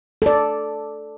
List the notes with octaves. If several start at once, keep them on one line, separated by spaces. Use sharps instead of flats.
A4 D5